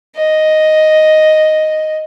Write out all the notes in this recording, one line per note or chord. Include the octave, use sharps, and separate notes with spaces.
D#5